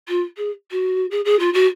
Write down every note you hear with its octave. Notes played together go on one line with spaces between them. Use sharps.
F4
G#4
F#4
G#4
G#4
F4
F#4